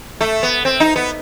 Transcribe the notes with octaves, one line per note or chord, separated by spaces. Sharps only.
A3
B3
C4
D#4
B3